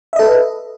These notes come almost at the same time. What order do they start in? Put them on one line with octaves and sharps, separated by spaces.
E5 D#5 A4 B4